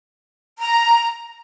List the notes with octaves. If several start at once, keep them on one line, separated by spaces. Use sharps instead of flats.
A#5